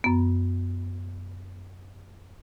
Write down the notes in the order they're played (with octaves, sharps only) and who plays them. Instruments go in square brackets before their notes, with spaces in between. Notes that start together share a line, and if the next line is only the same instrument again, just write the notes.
[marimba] F#2 B3